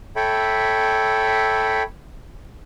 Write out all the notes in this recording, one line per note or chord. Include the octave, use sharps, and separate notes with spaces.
A4 C#5 E5 G5 B5